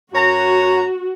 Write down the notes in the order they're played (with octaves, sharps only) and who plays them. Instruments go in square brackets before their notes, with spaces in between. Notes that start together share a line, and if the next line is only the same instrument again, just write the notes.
[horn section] F#2 C#5 A#5 [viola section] F#4